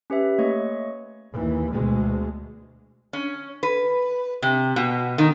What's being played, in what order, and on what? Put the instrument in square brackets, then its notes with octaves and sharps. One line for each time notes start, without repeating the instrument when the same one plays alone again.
[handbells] C#4 G4 B4 E5
A3 A#3 C#5 D#5 C#6
[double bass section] D#2 E3
D2 B2 G#3
[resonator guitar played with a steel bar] C#4
B4
C3
B2
D#3